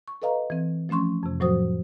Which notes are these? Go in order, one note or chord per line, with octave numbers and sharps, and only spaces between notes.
C#6
A4 B4 D#5 F5 A#5
E3 C4
F3 A3 C#4 C6 C#6
F2 C3
A2 F3 F#3 F#4 C5 D#6